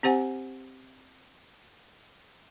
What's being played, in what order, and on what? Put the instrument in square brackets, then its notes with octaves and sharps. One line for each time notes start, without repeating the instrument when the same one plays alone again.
[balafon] C4 G4 C5 F#5 G#5